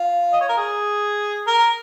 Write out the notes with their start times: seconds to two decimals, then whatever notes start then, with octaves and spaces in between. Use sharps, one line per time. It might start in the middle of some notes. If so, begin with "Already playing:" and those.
Already playing: F4
0.33 D#5
0.41 C#5
0.49 A#4
0.57 G#4
1.47 A#4